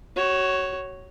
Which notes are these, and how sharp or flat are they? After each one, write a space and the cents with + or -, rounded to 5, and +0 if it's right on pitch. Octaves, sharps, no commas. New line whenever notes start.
F#4 +30 C#5 +0